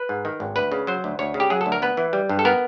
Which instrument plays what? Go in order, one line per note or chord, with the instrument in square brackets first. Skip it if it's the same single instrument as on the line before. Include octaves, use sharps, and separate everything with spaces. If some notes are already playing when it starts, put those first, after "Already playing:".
Already playing: [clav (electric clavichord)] B4
G#2
D#3
G#1
D2 B4
C#3
F#3 C5
D2
D2 C#5
C#3
G4
F#3 G#4
A4
D2
A#4
B3 B4
E3
G3
G2
A4
B3 A#4